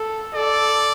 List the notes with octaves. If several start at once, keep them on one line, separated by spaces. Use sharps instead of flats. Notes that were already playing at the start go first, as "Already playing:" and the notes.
Already playing: A4
A4 D5